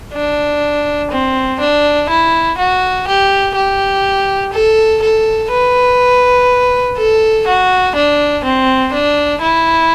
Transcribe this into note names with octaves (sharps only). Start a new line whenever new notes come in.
D4
C4
D4
E4
F#4
G4
G4
A4
A4
B4
A4
F#4
D4
C4
D4
E4